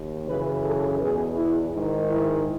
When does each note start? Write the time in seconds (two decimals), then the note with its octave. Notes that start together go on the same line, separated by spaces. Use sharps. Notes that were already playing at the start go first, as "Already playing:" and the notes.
Already playing: D#2
0.27 F#2 C#3 E3 B4
0.64 A4
1.00 E2 B2 G#4
1.36 E4
1.73 G#2 D#3
2.10 E4